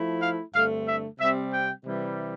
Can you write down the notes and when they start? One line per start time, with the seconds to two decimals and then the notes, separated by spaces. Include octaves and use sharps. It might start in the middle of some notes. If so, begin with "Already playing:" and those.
Already playing: F3 A3 E4
0.21 F5
0.53 G2 D3 A3 C4 F5
0.86 E5
1.19 C3 G3 C4 E5
1.52 G5
1.84 C3 E3 G3